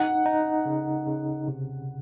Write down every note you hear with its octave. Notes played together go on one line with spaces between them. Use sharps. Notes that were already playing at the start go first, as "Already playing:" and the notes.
Already playing: D#4 F#5
D#4
C#3
C#3
C3